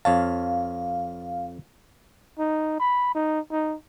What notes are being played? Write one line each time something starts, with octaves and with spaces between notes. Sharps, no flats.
F2 C#5 F5 A5
D#4
B5
D#4
D#4